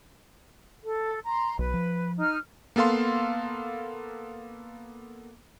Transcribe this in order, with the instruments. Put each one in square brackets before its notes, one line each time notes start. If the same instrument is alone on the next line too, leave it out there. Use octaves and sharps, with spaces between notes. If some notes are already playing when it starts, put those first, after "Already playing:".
[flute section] A4
A#5 C6
[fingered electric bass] B1 [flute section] B4
[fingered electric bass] F3
[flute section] D#4 F6
[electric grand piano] A#3 B3 A4 F5 C6